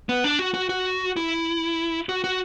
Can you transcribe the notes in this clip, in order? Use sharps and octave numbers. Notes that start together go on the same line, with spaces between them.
B3
D4
F#4
F#4
F#4
E4
F#4
F#4